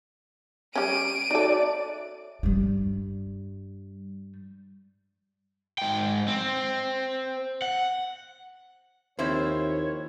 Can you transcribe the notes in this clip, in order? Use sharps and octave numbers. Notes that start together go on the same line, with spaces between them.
G3 C#4 D7 D#7
D#4 F#4 A4 C#5 D5 E5
G2 G3
G#2 G5
C4
F#5
D#2 F3 C4 E4 C5 C#5